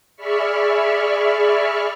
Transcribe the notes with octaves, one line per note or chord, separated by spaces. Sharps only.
G#4 D5 E5 B5 C#6 F6